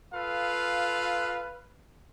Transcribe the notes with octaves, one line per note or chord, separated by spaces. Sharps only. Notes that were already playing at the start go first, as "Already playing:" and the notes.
F4 A4 B4 F5